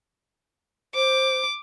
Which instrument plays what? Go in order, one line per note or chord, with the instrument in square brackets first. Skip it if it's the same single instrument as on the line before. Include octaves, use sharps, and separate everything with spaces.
[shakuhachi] C5 [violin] D6